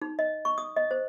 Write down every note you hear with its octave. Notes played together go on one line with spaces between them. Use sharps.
D#4
D#5
C#6
D#6
D#5
C5